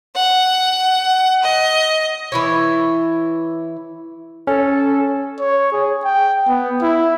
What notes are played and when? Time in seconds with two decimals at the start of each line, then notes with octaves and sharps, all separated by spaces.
0.16 F#5
1.43 D#5
2.32 E3 E4 C#5
4.47 C#4 A4
5.40 C#5
5.72 G#4
6.05 G5
6.48 B3
6.82 E4